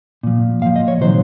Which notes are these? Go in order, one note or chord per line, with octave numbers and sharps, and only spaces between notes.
A#2 F3
A#2 F3 F5
D#5
C#5
C3 D#3 F#3 C5